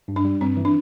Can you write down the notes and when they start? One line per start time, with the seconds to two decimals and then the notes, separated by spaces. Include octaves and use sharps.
0.08 G2
0.16 D4
0.25 G3
0.41 G2 C4
0.57 E3
0.65 D4